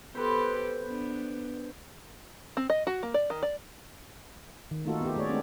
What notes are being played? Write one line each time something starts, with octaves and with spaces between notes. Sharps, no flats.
B3 G4 A4 B4 C5
B3 D4
C4
D#5
F#4
A#3
D5
D#3
D5
D#3
A3 A#3 D#4 F4 F#4 A4
B3 G4
A3 G#4 C#5 D5
G#3 A3 C4 D4